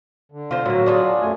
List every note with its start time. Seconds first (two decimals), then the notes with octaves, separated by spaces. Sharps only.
0.32 D3
0.51 F4 C5
0.66 A2 F#3 A#3 F#4
0.86 D4 F4 G#4
1.21 F#2 A3 G#5